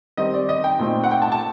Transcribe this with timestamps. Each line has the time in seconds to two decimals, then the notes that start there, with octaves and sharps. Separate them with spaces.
0.17 D#3 G3 C4 D#4 D#5
0.34 D5
0.49 D#5
0.64 G5
0.79 A#2 A3 C4 D#4
1.04 F#5
1.11 G5
1.22 A5
1.32 A5